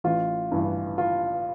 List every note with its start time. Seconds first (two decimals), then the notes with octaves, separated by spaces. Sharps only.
0.04 A1 F4
0.51 G2 E3
0.98 F4